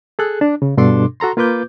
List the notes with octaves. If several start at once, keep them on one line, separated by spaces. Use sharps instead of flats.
G#4 A4 F#6
D4
C#3
G2 B2 D4 A4 C6 D6
F#4 A4 A#5 C6
A#3 F4 B4 D6 G6